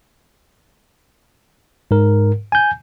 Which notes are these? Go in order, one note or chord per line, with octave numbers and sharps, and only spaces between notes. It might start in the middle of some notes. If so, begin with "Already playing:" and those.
G#2 A#4
G#5 G6